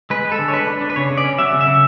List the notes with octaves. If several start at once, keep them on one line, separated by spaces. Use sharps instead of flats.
G#3 B4
G#3
A4
D3
C#5
G#3 B4
D4
D4
B4
C#3 C#5
C#3
D5
C#4
F#3 E5
C#3
E5
C#3